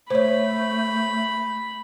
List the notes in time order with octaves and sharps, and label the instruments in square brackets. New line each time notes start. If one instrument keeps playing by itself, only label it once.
[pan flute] A3 [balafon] C5 C#5 [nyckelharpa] B5